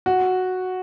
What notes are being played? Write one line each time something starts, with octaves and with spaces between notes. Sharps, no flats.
F#4